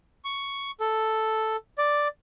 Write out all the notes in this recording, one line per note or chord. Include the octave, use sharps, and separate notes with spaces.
C#6
A4
D5